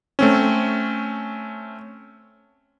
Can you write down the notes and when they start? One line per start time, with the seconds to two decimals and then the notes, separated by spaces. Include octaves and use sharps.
0.19 A3 C4 C#4